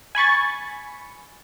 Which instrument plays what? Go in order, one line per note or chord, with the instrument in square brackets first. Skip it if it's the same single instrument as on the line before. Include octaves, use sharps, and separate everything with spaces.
[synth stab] G#5 B5 C#6 A6